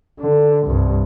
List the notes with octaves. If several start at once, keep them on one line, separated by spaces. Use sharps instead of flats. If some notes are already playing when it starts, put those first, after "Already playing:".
D3
C2 G2